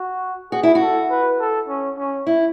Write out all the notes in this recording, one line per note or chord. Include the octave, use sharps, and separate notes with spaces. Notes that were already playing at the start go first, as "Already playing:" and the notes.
Already playing: F#4
F#4 G#4
E4
F#4
A4
B4
A4
C#4
C#4
E4